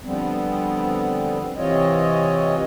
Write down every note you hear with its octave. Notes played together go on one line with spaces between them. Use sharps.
D3 F3 G3 B3 C4
C3 E3 C4 F4 C#5 D#5